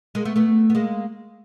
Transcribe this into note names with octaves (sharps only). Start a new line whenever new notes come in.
G#3 A#3
A3 B3
A3 B3
B3
G#3 A#3